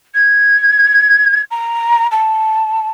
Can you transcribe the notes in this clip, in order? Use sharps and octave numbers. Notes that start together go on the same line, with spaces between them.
G#6
A#5
A5